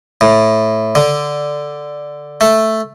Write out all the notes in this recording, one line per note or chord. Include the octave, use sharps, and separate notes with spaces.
A2
D3
A3